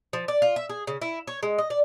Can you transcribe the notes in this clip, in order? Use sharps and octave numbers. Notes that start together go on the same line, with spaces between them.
F3
D5
F4
E5
G#4
C#3
E4
C#5
G#3
D#5
D5